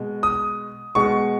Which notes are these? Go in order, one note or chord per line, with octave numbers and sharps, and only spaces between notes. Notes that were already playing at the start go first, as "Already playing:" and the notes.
Already playing: B2 G#3
D#6
B2 G#3 C#6